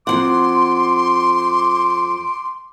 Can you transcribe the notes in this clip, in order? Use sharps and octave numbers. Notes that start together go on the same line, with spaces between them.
F2 F3 F#5 C6 D6